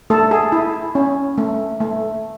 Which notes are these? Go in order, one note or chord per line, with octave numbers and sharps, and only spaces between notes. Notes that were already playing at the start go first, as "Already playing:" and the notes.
A3 A4
G#4
E4
C#4
A3
A3